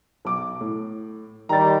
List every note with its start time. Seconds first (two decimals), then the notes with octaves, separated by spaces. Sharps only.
0.25 B1 D6
0.61 A2
1.49 D#3 G3 A#5 A6